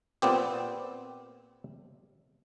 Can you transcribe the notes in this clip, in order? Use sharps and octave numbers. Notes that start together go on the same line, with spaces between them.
A#2 B3 C4 G4